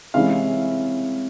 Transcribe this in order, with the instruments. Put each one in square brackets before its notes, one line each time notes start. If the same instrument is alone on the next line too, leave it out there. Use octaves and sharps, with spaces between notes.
[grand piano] C3 E3 G#3 C#4 E4 F5